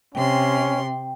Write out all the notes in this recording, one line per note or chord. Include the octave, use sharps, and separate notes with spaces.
C3 C#4 G5 C6